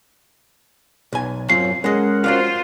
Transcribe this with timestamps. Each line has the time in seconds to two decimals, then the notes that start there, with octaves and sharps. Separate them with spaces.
1.13 B1 G#5
1.50 F#2 F#3 C4 F4 C7
1.84 G#3 C#4 A#4 D#5 F#5
2.24 F4 F#4 C5 D5 F5